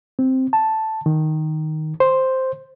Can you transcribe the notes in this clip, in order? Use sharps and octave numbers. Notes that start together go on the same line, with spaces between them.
C4
A5
D#3
C5